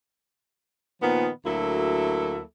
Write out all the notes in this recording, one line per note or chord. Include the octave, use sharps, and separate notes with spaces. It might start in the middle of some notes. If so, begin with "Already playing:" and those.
A#2 D#3 F3 B3
D2 F#3 A#3 E4 A4 E5